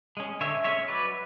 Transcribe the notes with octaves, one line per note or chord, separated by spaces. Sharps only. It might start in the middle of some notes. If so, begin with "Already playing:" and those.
G#3 C#4
D3 C#5 E5
G#3 C#4 C#5 E5
F#3 B4 D5